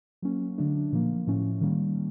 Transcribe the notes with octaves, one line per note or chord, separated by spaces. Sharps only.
F#3 A#3 C#4
D3 F#3 A3 D4
A#2 F3 A#3
A2 F3 A3 C#4
D#3 G3 A#3 C#4